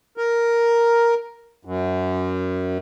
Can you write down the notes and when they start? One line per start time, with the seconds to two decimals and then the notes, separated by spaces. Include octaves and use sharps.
0.17 A#4
1.65 F#2